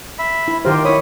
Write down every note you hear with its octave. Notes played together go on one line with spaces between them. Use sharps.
E5 B5
E4
D#3 F4 G4 A#4 C5
E4 C#5 B5 D#6